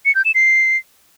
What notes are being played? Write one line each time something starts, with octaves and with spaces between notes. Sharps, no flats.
C#7
G6
E7
C7